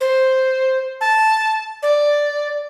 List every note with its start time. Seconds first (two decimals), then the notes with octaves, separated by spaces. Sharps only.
0.01 C5
1.01 A5
1.83 D5